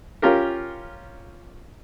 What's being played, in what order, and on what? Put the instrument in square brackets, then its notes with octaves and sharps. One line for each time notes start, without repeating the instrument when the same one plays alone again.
[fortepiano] C#4 F4 G4 A#4